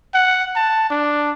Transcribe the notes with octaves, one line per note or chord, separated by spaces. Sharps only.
F#5
A5
D4